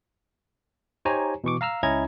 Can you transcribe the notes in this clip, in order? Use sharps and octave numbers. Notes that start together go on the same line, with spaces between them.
D#4 G4 C5 C#5 G#5 A#5
B2 E3 C#6 D6
F5 A#5 E6 F6
C#2 C#4 E4 D#5 A#5 G#6